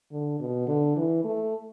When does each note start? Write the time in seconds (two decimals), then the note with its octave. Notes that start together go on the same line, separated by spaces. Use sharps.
0.12 D3
0.40 B2
0.67 D3
0.97 E3
1.24 A3